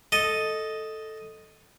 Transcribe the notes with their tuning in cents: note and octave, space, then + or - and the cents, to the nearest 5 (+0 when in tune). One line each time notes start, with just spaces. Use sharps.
A4 +0 D#5 +0